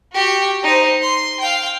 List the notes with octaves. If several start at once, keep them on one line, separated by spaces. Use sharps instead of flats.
F#4 G4
D#4 C5
C6
F5 G5